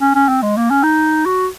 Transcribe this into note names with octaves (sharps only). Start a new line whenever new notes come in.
C#4
C#4
C4
G#3
A#3
C#4
D#4
F#4